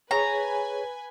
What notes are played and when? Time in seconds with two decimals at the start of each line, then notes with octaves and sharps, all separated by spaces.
0.11 G#4 B4 C#5 G#5 A#5